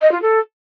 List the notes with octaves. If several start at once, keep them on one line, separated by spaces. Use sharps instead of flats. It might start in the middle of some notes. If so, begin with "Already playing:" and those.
D#5
F4
A4